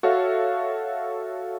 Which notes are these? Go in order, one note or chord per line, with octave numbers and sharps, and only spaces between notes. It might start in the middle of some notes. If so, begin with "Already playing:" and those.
F#4 A4 C#5 E5 F5